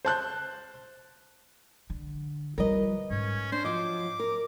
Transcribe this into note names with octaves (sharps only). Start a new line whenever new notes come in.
C5 A5 F#6 G6
D3
G3 F4 A#4 B4 D#5
G#2 C#4
D4 C5
F3 F#3 D#5 D6
A#4